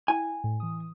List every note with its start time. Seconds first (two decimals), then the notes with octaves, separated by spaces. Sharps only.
0.08 E4 G5 G#5
0.44 A2
0.60 E3 D#6